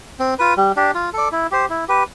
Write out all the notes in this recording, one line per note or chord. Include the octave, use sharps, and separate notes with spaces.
C4
F4 B4
G3
D4 G4
F4
A4 D5
E4
G4 C5
E4
G4 B4